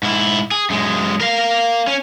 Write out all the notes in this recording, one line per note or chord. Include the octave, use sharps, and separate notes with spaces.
G#2 E4
G#4
F#2 G#3
A#4 F5
C#4